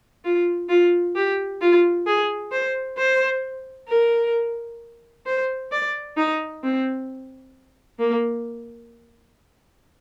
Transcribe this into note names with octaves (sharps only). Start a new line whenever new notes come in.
F4
F4
G4
F4
G#4
C5
C5
A#4
C5
D5
D#4
C4
A#3